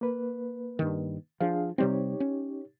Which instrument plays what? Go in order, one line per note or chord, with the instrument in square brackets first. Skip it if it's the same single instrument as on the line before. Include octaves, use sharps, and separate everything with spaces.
[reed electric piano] A#3 B4
[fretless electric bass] G2 D#3
[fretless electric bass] F3 [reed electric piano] D4 G#4 F5
[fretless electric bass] C3 G3 C4 [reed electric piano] D#4 G4 C#5
[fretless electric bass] C#4